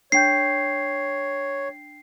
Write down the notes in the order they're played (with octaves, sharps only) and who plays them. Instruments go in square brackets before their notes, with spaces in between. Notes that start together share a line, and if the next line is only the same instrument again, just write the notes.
[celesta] D4 G5 G6 [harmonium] C#5 [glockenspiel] C7